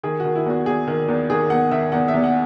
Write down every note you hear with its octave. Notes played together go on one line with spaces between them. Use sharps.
D#3 G#4
D#3 F#4
E4
E2 F#4
E2 G#4
D#3
E2
D#3 G#4
E2 F#5
D#3 E5
E2 F#5
E5
E2
F#5